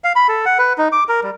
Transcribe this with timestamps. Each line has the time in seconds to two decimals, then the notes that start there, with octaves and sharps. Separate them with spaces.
0.04 F5
0.16 B5
0.29 A4
0.46 F#5
0.58 B4
0.78 D#4
0.92 D6
1.09 A#4
1.23 G3